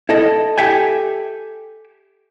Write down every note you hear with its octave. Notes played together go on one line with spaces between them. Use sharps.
E4 A4 D#5
G4 A4 E5 G5 G#5